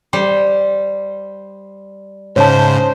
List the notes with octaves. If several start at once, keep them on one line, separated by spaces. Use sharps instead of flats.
G3 C5
G#2 C#3 C5 C#5 A5